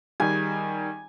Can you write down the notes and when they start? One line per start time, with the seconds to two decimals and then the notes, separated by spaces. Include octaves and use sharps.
0.20 D#3 G3 G#5